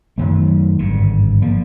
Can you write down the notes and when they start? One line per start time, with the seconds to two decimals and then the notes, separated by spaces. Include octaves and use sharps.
0.18 F#2 D#3 F#3 A3
0.79 G#1 G2 D3
1.42 F3 A#3